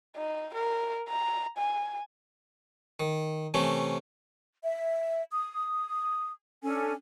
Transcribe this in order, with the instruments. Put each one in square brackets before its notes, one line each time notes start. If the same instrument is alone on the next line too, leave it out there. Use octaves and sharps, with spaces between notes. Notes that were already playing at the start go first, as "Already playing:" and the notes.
[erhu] D#4
A#4
A#5
G#5
[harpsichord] D#3
C3 E3 A3 C#4
[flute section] E5
D#6
C#4 D4 A4 G#5